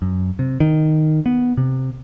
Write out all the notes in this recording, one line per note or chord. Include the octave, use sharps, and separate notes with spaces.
F#2
C3
D#3
B3
C3